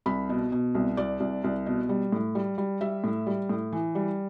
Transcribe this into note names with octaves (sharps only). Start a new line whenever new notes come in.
C2 B5
B2
B2
C2
C2 D5
C2
C2
B2
G3
A2
G3
G3
G3 E5
A2
G3
A2
E3
G3